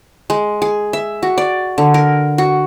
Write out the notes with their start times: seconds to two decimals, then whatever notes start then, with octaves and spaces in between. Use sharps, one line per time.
0.30 G#3
0.62 G#4
0.93 E5
1.23 F#4
1.38 D5
1.78 D3
1.94 A#4
2.38 F#4